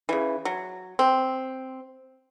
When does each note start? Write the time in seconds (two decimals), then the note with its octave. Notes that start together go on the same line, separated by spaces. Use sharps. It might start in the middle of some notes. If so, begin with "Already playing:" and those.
0.09 C#3 E3
0.45 F#3
0.99 C4